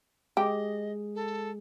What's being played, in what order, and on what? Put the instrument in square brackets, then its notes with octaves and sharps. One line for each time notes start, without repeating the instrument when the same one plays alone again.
[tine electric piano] G#3 G#4 [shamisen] G4 [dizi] D#5
[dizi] A4